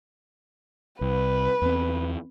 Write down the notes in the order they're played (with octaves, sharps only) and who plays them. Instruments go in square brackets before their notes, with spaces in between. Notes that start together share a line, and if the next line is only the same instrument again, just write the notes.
[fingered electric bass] C2 [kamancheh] B4
[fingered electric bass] E2 C4